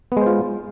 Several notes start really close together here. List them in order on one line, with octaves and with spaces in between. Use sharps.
B3 G#3 C5 F4